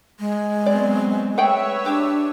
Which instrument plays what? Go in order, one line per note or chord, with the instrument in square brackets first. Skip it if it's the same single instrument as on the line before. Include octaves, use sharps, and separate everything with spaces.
[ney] G#3
[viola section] F#3 B3 C4 [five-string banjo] D5
[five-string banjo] A3 G#4 G5 [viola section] B4 C#5 E5
[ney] D4 [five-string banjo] G4